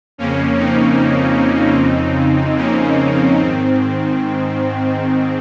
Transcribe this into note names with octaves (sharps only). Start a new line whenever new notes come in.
F2 C#3 A#3 C#4
C4 D#4
F2 C#3
A#3 C#4
G#2 D#3 C4